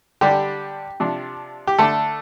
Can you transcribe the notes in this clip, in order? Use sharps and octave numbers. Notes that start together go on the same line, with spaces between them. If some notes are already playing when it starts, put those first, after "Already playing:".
D3 G3 D4 G4
C3 F3 D4
G4
D3 A3 D4 A4